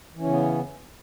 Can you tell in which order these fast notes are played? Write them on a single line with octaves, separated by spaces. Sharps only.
E3 C#4 C#3 B3